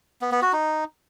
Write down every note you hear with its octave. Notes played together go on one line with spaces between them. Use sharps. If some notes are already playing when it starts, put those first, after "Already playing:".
B3
B3
F#4
D#4